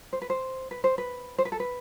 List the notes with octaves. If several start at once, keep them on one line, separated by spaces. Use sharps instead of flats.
C5
B4
C5
B4
C5
B4
C5
B4
A4
B4